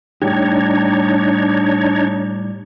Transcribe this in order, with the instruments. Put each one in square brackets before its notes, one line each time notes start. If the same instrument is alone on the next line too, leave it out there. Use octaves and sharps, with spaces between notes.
[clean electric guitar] A2 G3 G4 [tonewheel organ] D4 D#4 C#5